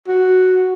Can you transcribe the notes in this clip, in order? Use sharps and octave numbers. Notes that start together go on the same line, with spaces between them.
F#4